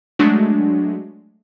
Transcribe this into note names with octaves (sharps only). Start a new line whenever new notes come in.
F#3 G#3 A3 D4 F#4